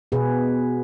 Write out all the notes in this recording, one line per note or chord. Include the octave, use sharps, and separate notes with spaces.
B2 B3 G#4 B4